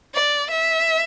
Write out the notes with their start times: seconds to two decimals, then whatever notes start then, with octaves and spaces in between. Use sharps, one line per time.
0.14 D5
0.51 E5